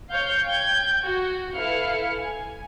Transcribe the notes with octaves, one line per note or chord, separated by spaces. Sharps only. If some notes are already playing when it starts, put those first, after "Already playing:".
C#5 F5 G6
G5 G6 G#6
F#4
E4 A4 B4 F5 F6 C#7
G#5